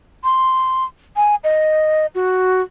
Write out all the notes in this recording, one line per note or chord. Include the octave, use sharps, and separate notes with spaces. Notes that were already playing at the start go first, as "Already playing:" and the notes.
C6
G#5
D#5
F#4